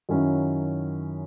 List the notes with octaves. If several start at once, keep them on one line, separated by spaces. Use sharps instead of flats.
F#2 D#3 F#3 C#4 E4